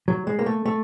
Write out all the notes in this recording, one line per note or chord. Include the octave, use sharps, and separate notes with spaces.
F#3
G#3
A#3
A3
A3